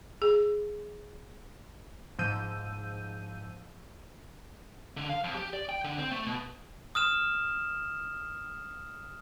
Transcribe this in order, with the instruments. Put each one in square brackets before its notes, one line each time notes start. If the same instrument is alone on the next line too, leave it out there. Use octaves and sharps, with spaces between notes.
[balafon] G#4
[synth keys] G#2 F3 E6 G6 D#7
[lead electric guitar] D3
F5
F2
G4
D5
G5
D3
C4
A3
B2
[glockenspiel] D#6 F6 E7